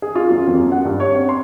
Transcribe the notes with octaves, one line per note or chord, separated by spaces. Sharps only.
G#4
F4
F#2
F2
F#2
F#5
G2
C#5
C4
C6